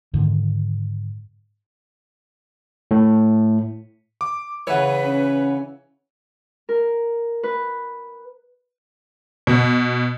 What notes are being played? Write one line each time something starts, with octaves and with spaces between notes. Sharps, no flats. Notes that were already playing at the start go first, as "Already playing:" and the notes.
G#2 D3 D#3
A2
D6
C#3 E3 B4 C#5 F#5
C#4
A#4
B4
B2